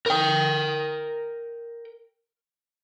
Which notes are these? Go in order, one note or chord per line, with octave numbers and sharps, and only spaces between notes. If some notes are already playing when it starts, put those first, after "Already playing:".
A#4 G5